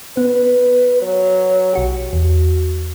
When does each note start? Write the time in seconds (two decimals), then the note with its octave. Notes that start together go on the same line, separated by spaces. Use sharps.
0.17 B3 B4
1.02 F#3
1.73 B1 F#4 G4
2.13 E2 F#4